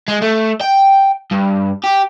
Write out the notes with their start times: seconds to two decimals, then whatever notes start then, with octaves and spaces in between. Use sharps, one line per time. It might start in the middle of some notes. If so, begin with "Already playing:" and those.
0.08 G#3
0.22 A3
0.61 G5
1.31 G2
1.84 G4